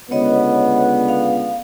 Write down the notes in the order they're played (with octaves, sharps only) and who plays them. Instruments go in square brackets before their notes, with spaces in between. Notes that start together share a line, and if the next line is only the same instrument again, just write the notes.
[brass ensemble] C#2 D3 B3 [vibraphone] C#5 D#5
[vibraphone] F5